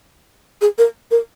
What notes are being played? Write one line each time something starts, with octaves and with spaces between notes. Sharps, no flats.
G#4
A#4
A#4